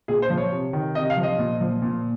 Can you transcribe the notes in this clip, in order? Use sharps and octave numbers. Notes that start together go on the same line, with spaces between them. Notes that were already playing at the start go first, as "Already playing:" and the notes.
A#2 G#4
C5
F3
C#5
C3
D#3
C3 D#5
F5
F3
D#5
A#2
F3
A#2